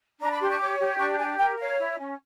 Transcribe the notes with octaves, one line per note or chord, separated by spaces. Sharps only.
D4 A#5
B5
G4 C6
C#6
C#5 D6
G4
D4 C#6
G4 G#5
A#4 G5
C#5 F5
E4
C#4